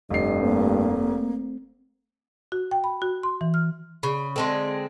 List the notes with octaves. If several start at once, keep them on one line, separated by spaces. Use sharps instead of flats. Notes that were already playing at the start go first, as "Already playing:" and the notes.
F1 G2 D#5 C7
A3 A#3 C4
F#4
G5
B5
F#4
C6
E3
F6
C#3 B5
D3 G#3 C4 A4 A5 C6